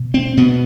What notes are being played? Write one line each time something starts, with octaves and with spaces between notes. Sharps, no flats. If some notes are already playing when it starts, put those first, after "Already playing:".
Already playing: B2
C4
B2 B3